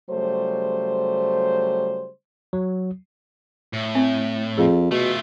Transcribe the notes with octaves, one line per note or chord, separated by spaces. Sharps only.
C#3 F#3 G3 A3 C5
F#3
A2
C4
F2 G#4
B2 A3 F4